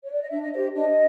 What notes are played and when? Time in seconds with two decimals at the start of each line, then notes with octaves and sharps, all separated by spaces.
0.02 C#5
0.11 D5
0.21 D#5
0.30 D4 E5
0.42 D#5
0.53 C5 E5
0.56 G4
0.75 D4 D#5